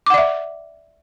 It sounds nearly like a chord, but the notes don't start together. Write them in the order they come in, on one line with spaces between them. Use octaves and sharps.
D6 F#5 D5 E5